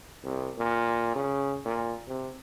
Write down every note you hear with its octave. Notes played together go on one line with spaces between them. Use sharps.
C2
A#2
C#3
A#2
C3